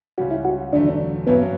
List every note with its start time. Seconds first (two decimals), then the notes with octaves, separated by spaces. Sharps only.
0.18 C#2 C#3 G3 C#4 F#4
0.31 E4
0.45 F#4
0.72 E1 E2 D3 F#3 A3 D4
1.27 G2 F#3 B3 C#4 E4